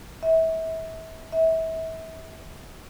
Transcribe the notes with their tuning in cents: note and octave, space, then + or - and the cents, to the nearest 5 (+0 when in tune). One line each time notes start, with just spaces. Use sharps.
E5 -30
E5 -30